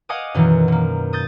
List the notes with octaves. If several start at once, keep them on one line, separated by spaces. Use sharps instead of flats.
D#5 F5 F#5 G#5 D6 D#6
F#2 B2 D#3 E3
B2 A#3
D#6 G6 A6